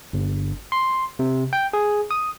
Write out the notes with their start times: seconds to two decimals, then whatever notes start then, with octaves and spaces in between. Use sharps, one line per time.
0.13 G1
0.72 C6
1.19 C3
1.53 G5
1.73 G#4
2.11 D#6